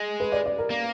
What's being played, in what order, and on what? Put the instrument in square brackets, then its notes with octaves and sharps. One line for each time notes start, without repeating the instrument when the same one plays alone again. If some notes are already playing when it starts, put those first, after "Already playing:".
Already playing: [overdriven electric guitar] G#3
[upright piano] B4
D5
D5
A#4
[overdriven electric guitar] A#3